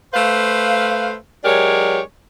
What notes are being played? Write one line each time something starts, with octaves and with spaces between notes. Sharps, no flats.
A3 B4 C5 F5
F#3 G#3 D4 G4 A#4 C#5